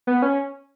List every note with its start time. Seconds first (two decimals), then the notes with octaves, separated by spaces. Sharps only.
0.07 B3
0.22 C#4